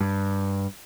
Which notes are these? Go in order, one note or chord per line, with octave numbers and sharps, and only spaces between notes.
G2